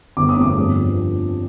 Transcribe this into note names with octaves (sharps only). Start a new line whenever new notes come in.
G1 D6
D#6
F2 D6
G2
F3